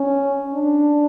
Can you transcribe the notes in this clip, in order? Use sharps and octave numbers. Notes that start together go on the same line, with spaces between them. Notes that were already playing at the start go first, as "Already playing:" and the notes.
Already playing: C#4
D4